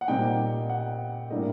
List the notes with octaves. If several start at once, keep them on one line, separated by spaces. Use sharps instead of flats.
F#5
A#2 G3 C4 D#4 G5
F#5
A2 G3 A#3 D4 D#5